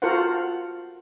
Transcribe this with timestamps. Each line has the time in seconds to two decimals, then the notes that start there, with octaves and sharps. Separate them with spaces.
0.02 F4 F#4 A4 A#4 C5 F#5